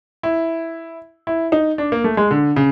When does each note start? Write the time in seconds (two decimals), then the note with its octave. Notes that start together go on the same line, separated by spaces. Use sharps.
0.23 E4
1.27 E4
1.52 D#4
1.78 D4
1.92 A#3
2.04 A3
2.17 G#3
2.31 D3
2.56 C#3